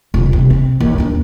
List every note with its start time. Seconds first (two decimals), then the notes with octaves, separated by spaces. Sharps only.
0.14 D#1 C#3
0.33 C3
0.50 C4
0.80 D#2 D#3
0.98 D#2 D4